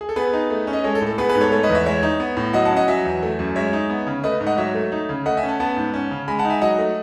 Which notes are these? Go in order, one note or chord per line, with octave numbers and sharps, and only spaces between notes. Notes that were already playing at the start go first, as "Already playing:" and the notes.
G#4
A4
B3 G#4 B4
D#4
A3
C#4
D#5
G#3 A4 C#5
A4
A2
A4
B3 G#4 B4
G#4 B4
G#2
A4 C#5
A3 A4 C#5
B4 D#5
E2
C#5 E5
G#3 C#5 E5
D#4
B3
A2
F#3 D#5 F#5
F#5 A5
C#4
D#5 F#5
F#3 E5 G#5
E2
A3
F#2
G#3 C#5 E5
D#4
B3
C#3
A3 B4 D#5
G#2
D#5 F#5
F#3 C#5 E5
A3
D#4
C#3
A3 D#5 F#5
E5 G#5
C#4
F#5 A5
B3 F#5 A5
G#2
C#4
C#3
G#3 G#5 B5
F#5 A5
D#4
E5 G#5
F#3 D#5 F#5
A3